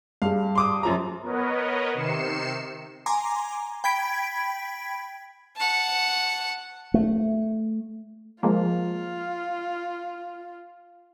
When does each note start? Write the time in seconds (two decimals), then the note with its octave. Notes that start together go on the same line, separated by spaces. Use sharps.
0.22 G2 G#4 F5
0.55 C6 D6 D#6
0.83 F#2 F3 A#5
1.21 B3 A#4 B4 C#5 D#5
1.94 C3 D#3 C7 C#7 E7
3.06 G#5 A#5 C6 D6
3.84 G5 B5 G#6 B6 D7
5.56 F#5 A5
6.94 A3
8.43 F3 G#3 A#3 F4